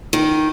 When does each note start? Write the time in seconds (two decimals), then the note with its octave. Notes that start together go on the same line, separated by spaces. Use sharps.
0.13 D#3